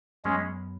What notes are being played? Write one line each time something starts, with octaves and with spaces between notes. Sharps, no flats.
F#2 F#3 G#3 B3 C#4